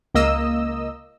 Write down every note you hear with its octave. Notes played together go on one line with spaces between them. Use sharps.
C#2 A#3 D#5 E6